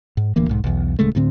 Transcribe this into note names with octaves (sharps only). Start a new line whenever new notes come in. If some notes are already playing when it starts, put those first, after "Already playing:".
G#2
D1 D2 E3 A#3
B1 G#2
B1 E2
D1 C#3 G#3 A3
D2 A2 D3 C4